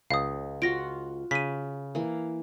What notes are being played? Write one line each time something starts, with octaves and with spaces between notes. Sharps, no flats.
C#2 F5 D#6
F4 F#4 A#6 D7
C#3 B6 D#7
E3 A#3